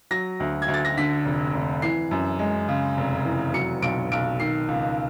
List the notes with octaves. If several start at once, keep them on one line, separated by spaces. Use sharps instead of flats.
F#3 A#6
D2
G#6
D2
A6
A#6
D3 B6
F1
F1
E3 C7
F#2
G#3
C#3
F1
E3
F#3 C#7
B1 D7
B1 D7
D#3 C7
C#2